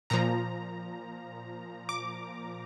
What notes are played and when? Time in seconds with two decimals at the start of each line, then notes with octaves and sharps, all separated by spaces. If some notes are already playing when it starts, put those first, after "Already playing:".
0.10 A#2 F3 A#5
1.89 D6